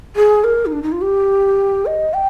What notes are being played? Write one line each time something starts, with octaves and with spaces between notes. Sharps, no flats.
G#4
A#4
D#4
D4
D#4
F4
G4
D#5
G5